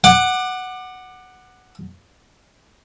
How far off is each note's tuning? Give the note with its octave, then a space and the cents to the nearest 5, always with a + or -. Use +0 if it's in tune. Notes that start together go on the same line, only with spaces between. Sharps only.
F#5 +0 D6 +30